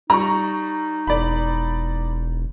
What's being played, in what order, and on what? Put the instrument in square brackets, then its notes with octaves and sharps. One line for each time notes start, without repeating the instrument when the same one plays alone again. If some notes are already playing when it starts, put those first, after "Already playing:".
[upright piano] G3 [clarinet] D#4 [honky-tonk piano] A#5 C#6
[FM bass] E1 [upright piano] D5 B5